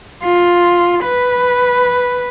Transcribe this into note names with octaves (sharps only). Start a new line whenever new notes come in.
F4
B4